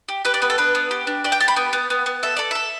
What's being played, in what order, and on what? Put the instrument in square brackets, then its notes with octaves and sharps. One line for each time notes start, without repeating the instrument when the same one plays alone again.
[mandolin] G4
G4 B4
D5
B3 B4
A4
D4 B4
B3
G4
D4
G4 D5
G5
G4 A5
B5
B3 G5
B3
B3
B3
A4 E5
A4 D5
A4 E5